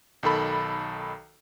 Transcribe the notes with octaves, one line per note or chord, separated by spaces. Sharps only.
B1 D#3 A4 B5